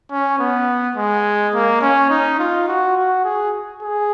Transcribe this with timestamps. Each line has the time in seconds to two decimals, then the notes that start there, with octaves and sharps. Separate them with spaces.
0.11 C#4
0.39 B3
0.97 G#3
1.54 A#3
1.82 C#4
2.10 D#4
2.39 F4
2.68 F#4
2.97 F#4
3.25 G#4
3.82 G#4